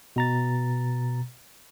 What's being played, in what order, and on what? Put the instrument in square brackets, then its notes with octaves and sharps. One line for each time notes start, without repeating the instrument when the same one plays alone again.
[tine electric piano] B2 A#5 A6